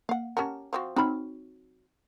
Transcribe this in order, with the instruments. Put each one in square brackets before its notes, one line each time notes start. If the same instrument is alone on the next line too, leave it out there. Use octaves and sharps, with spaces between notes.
[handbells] A#3 [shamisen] F5 F#5
[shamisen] C#4 G4 A#4 [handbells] F#5 A5
[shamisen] F3 C4 F#4
[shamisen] F#3 C5 B5 [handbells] C4 D#4 F6